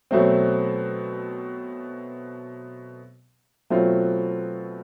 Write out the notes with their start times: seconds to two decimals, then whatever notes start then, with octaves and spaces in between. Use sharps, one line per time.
0.11 B2 F#3 A3 C4
3.70 B2 F#3 A3 C4 F4